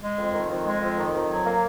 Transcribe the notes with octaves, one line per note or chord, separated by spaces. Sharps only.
G#3
F2
D#3
F2
G#3
F2
D#3
F2
F#3
A#3